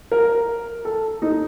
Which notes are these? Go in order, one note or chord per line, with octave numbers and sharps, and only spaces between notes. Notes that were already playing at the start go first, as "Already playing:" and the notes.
A#4
A4
D#4